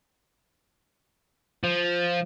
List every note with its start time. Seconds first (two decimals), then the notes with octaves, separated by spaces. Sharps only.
1.64 F3